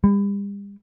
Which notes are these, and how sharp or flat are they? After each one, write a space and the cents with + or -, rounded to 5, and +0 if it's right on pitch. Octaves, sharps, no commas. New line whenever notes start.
G3 +40